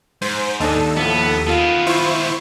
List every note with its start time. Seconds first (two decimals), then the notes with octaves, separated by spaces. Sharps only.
0.22 G#2 C5
0.60 D#2 D4 D#4 A4
0.97 A2 F3 B3
1.47 D#3 B3 F4
1.87 E4 C5 C#6